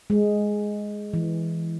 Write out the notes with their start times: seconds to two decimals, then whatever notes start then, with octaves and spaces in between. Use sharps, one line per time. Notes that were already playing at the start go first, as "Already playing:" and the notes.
0.10 G#3
1.13 E3